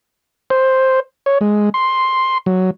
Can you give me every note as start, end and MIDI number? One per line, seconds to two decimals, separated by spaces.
0.50 1.00 72
1.26 1.38 73
1.41 1.69 56
1.74 2.38 84
2.46 2.70 54